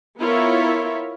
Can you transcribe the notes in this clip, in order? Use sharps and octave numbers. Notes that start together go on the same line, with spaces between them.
B3 E4 F4 A#4 C#5 E5